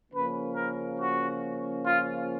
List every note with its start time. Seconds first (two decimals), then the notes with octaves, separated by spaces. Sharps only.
0.12 C#3 F3 A#3 C#4 B4
0.55 A#4
0.99 F#4
1.84 F4